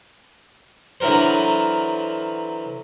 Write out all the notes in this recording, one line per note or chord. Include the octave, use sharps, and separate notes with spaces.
D3 E3 F#3 A#4 C5